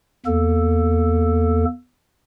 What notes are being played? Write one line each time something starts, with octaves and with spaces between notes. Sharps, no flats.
E2 A#3 A4